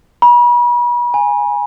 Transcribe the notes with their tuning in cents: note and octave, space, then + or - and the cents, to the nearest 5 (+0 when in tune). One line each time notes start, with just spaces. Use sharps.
B5 -40
G#5 -10